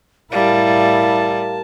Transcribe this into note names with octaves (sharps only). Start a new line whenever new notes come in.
A2 G3 E4 A#4 F5 A5